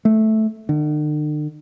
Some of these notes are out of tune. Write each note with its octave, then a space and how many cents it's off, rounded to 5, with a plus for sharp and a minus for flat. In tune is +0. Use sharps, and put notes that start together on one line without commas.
A3 -10
D3 +45